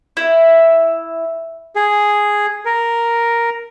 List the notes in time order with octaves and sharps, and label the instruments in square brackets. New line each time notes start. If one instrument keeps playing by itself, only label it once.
[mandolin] E4
[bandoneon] G#4
A#4